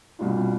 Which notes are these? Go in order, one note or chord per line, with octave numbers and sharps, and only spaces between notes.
C2 B2 G3 D4 F4